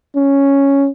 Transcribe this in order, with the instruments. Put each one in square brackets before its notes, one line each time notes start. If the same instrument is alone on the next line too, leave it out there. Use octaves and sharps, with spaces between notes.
[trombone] C#4